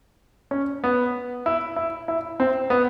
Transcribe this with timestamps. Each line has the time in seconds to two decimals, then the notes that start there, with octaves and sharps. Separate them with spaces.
0.51 C#4
0.84 B3
1.46 E4
1.76 E4
2.08 E4
2.40 C4
2.70 B3